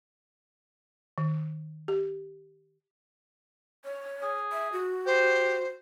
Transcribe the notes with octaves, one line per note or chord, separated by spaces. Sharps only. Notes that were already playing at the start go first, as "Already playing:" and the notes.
D#3
G4
C#5
G#4
E5
F#4
G4 C5